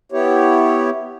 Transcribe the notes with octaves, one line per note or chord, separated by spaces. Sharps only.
B3 E4 G4 C#5